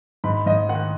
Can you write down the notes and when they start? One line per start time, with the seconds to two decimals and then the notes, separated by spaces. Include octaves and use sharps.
0.24 G#2 B5
0.46 G#2 D#5
0.69 D#3 F#5